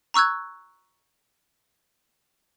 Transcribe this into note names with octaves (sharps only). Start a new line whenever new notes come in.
A#5 C#6 E6 F#6 G#6